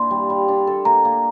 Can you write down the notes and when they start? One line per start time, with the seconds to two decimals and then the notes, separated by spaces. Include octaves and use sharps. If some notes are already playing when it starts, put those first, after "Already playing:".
Already playing: A#2 D4 E4 C6
0.11 G3
0.30 G3
0.48 D4
0.67 A4
0.85 A#3 A#5
1.05 A#3